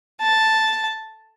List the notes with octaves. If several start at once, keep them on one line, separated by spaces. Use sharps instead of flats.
A5